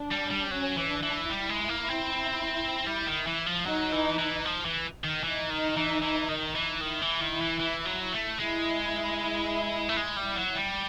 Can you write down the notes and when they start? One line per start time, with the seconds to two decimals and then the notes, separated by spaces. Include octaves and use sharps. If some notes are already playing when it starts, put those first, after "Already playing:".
Already playing: D4
0.11 G3
0.30 G3
0.51 F#3 C#4
0.77 E3
0.90 D4
1.03 E3
1.30 G3 E4
1.49 G#3
1.69 A#3
1.89 C4
2.87 G3
3.06 D#3
3.27 E3
3.46 F3
3.66 F#3 D#4
3.92 E3
4.18 E3
4.45 F3
4.65 E3
5.04 D#3
5.24 E3 D#4
5.50 D#3
5.77 E3
6.02 E3
6.29 D#3
6.55 E3
6.81 D#3 E4
7.02 E3
7.21 D#3
7.41 E3
7.60 E3
7.86 F#3
8.12 A3
8.39 G#3 E4
9.89 A3
9.97 G#3
10.16 G3
10.36 F#3
10.55 G3